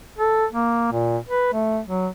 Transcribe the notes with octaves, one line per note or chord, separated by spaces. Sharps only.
A4
A#3
A#2
B4
A3
F#3